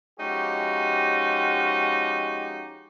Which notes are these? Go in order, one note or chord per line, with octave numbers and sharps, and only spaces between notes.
F3 G#3 C#4 D#4 F#4 G4